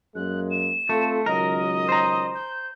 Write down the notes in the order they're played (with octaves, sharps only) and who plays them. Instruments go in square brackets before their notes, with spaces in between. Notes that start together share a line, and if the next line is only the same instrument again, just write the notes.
[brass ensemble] F#2 G#3 A#3 [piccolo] F#6
[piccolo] E7
[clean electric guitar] A3 [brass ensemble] C4 F4 A4
[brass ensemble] C#2 D#3 F#3 [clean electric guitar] A#4 [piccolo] D#5
[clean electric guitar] C5 A#5
[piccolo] G6